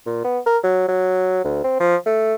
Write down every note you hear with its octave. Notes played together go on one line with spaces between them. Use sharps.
A#2
B3
A#4
F#3
F#3
D2
C4
F3
A3